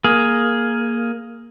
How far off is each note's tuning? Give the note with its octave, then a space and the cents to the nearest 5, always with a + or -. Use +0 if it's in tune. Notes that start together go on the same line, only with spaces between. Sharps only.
A#3 +0 G#4 +5